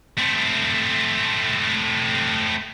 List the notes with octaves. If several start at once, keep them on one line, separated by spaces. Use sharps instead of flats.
A3 C4